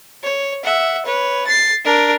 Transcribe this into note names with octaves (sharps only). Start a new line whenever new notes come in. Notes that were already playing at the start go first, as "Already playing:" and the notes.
C#5
E5 F#5
B4 C#5
A6 C7
D4 A#4